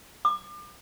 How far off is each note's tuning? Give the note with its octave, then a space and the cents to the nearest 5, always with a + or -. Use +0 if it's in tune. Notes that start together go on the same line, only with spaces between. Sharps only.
D6 +35